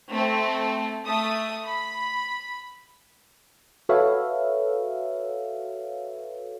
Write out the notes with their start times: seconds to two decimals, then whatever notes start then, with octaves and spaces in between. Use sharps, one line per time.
0.10 A3 C4
1.05 A3 D#6
1.64 B5
3.89 F#4 A4 B4 C#5 E5 F5